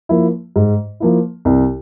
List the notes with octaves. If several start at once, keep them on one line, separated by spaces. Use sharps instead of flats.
F3 A#3 E4
G#2
F3 A#3 E4
C2